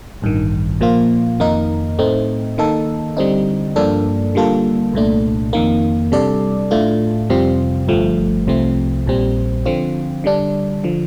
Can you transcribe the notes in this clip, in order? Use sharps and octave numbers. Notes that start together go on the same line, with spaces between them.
A1 G2 D#3
A#2 F3 A#3 F4
F2 D#3 A#3 D#4 A#4
A2 A3 C4 D#4
D#3 A#3 D#4 A4
D3 G3 C4 D#4
G2 F3 A#3 D4 A4
D3 G3 A#3 F4 A4
C2 A#2 A3 D4
F2 D#3 A#3
C3 G3 D4 A4 D5
A2 A3 D4 F4
F2 C3 G3 C4 F4
G1 G2 F3 A3
C2 C3 F3 A3 C4
A#1 A#2 G3 C4
D3 F3 C4 F4
D3 G3 D4
D3 F3